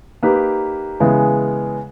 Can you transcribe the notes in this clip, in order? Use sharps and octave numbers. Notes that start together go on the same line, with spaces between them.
A#3 D#4 G4 B4
C#3 E3 G#3 B3